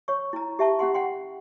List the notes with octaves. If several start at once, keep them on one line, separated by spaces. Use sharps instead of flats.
C#5 C#6
E4 A#5
G4 E5 A5 C#6
C#4 G4 F#5 C6
F#5 G5 C6